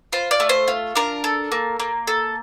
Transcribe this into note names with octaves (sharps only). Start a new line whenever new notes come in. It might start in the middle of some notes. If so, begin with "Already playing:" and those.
F4 C5
D5
A3
C5
F4
D4 A#4
A4
A#3
A#3
A4